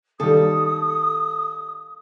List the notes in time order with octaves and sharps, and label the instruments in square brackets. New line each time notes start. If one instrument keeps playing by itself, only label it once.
[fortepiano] D#2 G3 [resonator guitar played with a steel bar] A4 [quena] D#6